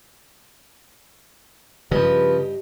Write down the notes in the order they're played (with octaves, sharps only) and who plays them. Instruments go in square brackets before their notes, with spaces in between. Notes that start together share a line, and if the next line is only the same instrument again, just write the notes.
[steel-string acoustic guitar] G2 G4 D#5 [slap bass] C#3 F3 [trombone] B4